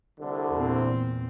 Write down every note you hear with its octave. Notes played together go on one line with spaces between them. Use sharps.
C2 D3
E2 A#2 C4